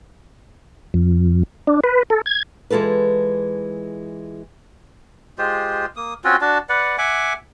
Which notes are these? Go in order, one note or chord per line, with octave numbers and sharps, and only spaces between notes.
F2
D4
B4
A4
G#6
E3 G#3 F4 A4 B4
G#3 F4 G4 C5
A#3 D#6
C4 C#4 F4 F#4
D4 F#4 A5
B4 D5 F#5
E5 F#5 G#5 D6